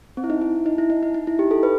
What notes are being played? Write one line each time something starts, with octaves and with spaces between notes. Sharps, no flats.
C4
E4
D#4
E4
D#4
E4
D#4
D#4
D#4
E4
G4
A4
B4